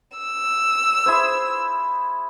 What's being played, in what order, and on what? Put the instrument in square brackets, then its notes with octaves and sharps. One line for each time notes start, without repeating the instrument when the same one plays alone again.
[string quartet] E6
[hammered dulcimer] E4 G#4 C5